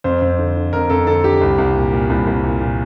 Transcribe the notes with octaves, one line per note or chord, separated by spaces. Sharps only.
F2 C5
F2
D3
D3
F2 A#4
F2 A4
D3 A4
D3 G4
C2
C2
A#2
A#2
C2
C2
A#2
A#2